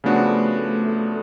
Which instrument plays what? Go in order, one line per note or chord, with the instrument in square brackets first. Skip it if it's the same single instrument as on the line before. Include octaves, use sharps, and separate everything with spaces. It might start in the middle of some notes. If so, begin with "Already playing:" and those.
[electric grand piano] C#3 F3 B3 D4 F#4 [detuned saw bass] A3